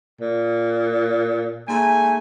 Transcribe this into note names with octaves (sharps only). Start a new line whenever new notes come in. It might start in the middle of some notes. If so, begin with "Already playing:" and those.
A#2
G#2 A3 A#3 G#5